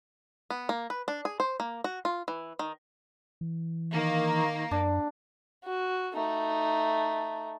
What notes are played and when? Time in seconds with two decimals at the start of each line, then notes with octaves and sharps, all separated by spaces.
0.50 B3
0.69 A#3
0.90 B4
1.08 D4
1.25 G#4
1.40 C5
1.60 A#3
1.84 F#4
2.05 F4
2.28 E3
2.59 D#3
3.41 E3
3.93 D#3 A#3
4.71 F#2 D4
5.64 F#4
6.14 A3 D#4